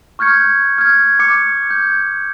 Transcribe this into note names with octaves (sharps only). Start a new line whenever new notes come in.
C#6 F6 G6 G#6 C#7
F6 G#6
D6 G#6 C#7
G6